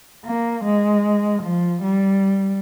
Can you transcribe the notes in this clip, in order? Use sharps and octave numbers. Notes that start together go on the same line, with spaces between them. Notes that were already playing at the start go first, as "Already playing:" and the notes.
A#3
G#3
F3
G3